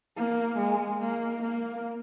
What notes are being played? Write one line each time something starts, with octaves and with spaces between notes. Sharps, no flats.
A#3
G#3
A#3
A#3